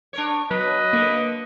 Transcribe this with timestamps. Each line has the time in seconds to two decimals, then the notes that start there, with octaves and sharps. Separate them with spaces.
0.13 D4 A#4 C#5
0.51 F#3 B3 B4 D#5
0.93 D3 A#3